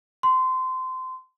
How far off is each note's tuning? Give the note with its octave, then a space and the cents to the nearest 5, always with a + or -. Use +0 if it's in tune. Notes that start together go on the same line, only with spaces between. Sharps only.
C6 -25